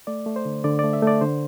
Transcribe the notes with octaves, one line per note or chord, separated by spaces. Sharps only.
A3 D5
A3
C5
D3
D3 D5
A3 D5
E5
A3 D5
D3 C5